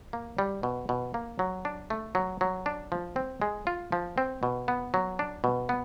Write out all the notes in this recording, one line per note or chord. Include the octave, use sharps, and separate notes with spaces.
A#3
G3
B2
B2
A#3
F#3
D4
A3
F#3
F#3
D4
F3
C4
G#3
F4
F3
C4
B2
B3
F#3
D4
B2
B3